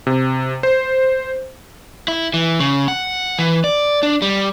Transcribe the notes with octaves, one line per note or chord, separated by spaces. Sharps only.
C3
C5
E4
E3
C#3
F#5
E3
D5
D4
G3